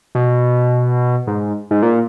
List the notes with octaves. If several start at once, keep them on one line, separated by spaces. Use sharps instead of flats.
B2
G#2
G#2
A#2